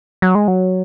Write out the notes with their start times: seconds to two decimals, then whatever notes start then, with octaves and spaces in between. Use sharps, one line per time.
0.22 F#3
0.35 G#3
0.48 F#3